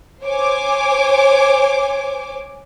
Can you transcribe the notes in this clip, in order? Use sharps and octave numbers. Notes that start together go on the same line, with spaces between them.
C5 C#5 G#5 D6